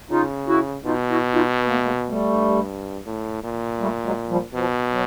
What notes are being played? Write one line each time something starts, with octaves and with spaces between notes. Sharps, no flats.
C#3 D#4 F4
E4 F#4
B2 D#4 F4
E4 F#4
D#4 F4
B3
A#3
A3 B3
G#3 A#3
G3 A3
G2
A2
A#2
G3 A3
F#3 G#3
F3 G3
B2 F3
F#3